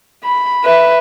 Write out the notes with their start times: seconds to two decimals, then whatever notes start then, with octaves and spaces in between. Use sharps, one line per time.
0.24 B5
0.64 B4 E5